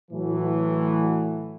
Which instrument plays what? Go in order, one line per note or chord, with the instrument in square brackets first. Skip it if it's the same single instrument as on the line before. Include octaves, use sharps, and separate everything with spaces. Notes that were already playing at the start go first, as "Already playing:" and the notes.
[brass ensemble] A2 E3 F#3